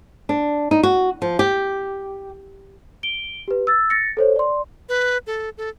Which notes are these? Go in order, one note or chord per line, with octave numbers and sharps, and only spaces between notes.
D4
D#4
F#4
F3
G4
D7 G7
G4 B4
E6 A6
A6 A#6 C#7
A4 C5 C#5
D5 C6
B4
A4
A4